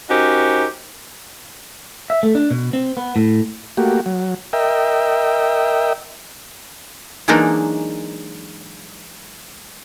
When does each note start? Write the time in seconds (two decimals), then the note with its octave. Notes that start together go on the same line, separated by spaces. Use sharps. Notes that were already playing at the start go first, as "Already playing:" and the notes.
0.10 C#4 D#4 F#4 G4 A#4 C5
2.10 E5
2.23 A3
2.35 D4
2.51 B2
2.73 C4
2.97 B3
3.16 A2
3.77 A3 A#3 F#4 G4
4.06 F#3
4.53 A#4 D#5 E5 G5
7.28 E3 F#3 G#3 A#3 D4 D#4